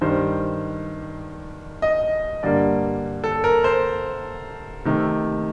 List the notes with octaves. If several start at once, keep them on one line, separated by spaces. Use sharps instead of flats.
G2 D#3 G3 C5
D#5
G2 D3 G3 A#3 D5
A4
A#4
C5
C3 D#3 A3